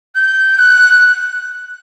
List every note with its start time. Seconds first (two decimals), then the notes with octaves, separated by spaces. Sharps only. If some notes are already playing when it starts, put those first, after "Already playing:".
0.15 G6
0.58 F#6